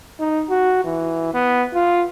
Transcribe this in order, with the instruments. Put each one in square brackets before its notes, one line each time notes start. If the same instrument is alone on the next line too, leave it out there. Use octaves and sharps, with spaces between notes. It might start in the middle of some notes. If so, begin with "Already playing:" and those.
[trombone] D#4
F#4
E3
B3
F4